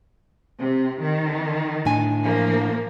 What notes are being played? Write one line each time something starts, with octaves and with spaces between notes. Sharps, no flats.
C3
D#3
A2 D4 G#5
F3 A#3